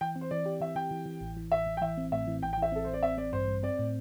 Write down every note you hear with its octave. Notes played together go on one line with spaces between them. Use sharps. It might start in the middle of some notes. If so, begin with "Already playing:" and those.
E3 G5
C4
C5
E3 D5
G4
E3 E5
E3 G5
E3
E3
A1
E3
A1 E5
A1
G5
E3 E5
C4
A2 E5
E3
A1 G5
G5
E3 E5
C4 A4
A1 C5
D5
C4 E5
C4 D5
G2 C5
G2
C4 D5
A2